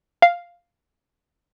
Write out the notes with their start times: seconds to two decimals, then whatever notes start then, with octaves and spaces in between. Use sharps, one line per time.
0.22 F5